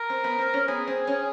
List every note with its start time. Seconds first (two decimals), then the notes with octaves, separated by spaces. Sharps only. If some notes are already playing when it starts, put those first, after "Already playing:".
Already playing: A#4
0.10 C4
0.24 B3
0.39 C4
0.54 C#4
0.68 B3 G#4
0.88 C4
1.07 C#4